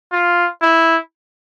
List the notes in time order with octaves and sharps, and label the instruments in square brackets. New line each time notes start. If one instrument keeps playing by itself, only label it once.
[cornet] F4
E4